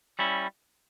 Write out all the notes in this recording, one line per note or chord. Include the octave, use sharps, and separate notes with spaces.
G3 C#4 E4